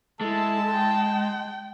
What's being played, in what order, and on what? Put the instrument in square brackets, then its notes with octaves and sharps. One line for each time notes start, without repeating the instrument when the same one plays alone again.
[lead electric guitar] G#3 [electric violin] E4 A4 [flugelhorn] A5
[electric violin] G5